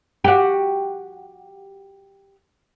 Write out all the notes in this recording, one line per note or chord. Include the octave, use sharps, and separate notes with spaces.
F#4 G4